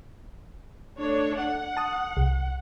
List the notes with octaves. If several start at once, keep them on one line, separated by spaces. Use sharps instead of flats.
A3 D4 C#5
F#5
A5 D#6
C2